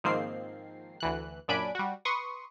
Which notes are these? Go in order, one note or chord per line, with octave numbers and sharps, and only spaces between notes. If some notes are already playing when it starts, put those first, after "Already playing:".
G#2 D#3 F3 A#3 C4 C7
D2 E3 F#6
F#2 A#2 D4 G#5 B5 D7
G3 F#4
B4 C6 C#6 D#6